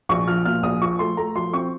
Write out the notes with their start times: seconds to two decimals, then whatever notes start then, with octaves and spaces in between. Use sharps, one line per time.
0.09 A#1 C#6
0.28 F3 F6
0.45 A#2 F6
0.63 A#1 D#6
0.81 F3 C#6
0.99 A3 C6
1.17 A3 A#5
1.35 F3 C6
1.53 C4 C#6